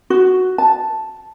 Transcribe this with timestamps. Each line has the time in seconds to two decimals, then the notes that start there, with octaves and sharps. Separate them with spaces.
0.10 F#4
0.58 A5